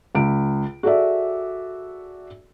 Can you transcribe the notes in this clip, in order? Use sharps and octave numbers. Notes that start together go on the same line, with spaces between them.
C#2 D7
F#4 G#4 A4 D5 E5